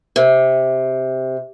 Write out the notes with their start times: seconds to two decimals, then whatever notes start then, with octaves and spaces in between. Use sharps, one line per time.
0.16 C3